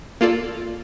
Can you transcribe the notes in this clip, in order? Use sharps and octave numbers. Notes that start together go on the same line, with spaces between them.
A#3 F4 A4 D5